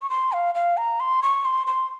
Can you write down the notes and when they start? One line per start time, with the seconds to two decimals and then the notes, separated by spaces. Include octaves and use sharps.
0.02 C#6
0.10 C6
0.32 F5
0.55 F5
0.77 A#5
1.00 C6
1.23 C#6
1.45 C6
1.67 C6